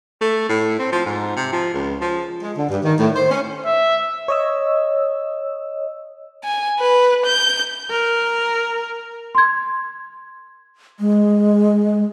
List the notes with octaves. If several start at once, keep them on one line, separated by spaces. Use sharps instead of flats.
A3
A2
C4
F3
G#2
C3
F3
C#2
F3
G#3
D3
G2
D#3
A2
C5
C#4
E5
C#5 D#5 E6
G#5
B4
G6
A#4
C6 G#6
G#3